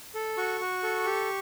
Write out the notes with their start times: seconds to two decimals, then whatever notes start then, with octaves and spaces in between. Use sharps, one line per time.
0.15 A4
0.37 F#4 C#6
0.61 F#4
0.83 A4
1.06 G4